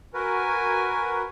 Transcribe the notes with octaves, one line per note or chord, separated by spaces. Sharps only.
F#4 A#4 B4 G#5